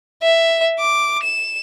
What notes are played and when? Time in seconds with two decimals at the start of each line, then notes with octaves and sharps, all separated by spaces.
0.22 E5
0.79 D6
1.23 E7